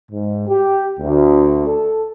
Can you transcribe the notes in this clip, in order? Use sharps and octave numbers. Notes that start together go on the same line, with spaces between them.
G#2
G4
D2
A4